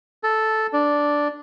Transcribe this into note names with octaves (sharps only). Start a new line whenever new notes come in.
A4
D4